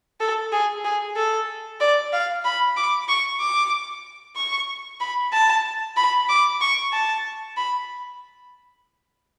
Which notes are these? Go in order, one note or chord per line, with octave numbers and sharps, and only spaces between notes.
A4
G#4
G#4
A4
D5
F5
B5
D6
C#6
D6
C#6
B5
A5
B5
D6
C#6
A5
B5